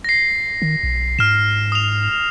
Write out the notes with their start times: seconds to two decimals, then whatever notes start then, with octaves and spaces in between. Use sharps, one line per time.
0.04 A#6 C7
0.62 D#3
0.83 B1
1.19 G#2 F6 E7
1.72 D#6 F7